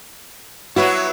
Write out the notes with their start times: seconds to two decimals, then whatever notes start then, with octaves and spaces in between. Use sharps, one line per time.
0.76 F#3 B3 E4 F#4 C#5